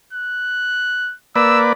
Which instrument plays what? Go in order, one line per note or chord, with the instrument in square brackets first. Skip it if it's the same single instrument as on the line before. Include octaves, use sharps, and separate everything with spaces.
[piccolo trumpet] F#6
[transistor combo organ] A#3 B4 D5 [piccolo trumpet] E6